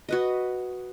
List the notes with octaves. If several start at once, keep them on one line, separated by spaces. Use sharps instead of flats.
F#4 B4 D#5